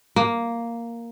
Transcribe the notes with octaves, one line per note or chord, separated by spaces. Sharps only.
A#3